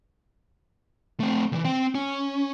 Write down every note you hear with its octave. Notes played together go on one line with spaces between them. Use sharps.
A3 C4
D2 E3
C4 G5
C#4